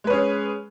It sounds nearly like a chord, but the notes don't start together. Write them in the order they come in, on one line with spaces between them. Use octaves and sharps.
G#3 B4 C#4 G#4